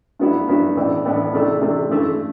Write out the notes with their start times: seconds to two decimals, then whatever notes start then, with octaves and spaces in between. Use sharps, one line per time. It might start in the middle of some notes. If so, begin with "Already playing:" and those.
0.19 G2 F#3 B3 E4
0.48 G2 F#3 B3 E4
0.77 A2 E3 B3 D4
1.05 A2 E3 B3 D4
1.33 C3 E3 A3 D4
1.61 C3 E3 A3 D4
1.90 G2 E3 A3